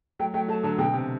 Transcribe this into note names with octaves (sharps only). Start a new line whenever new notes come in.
F#3 A3 G5
F#3 A3 G5
F#3 A3 A5
D3 F#3 A5
B2 D3 G5
C3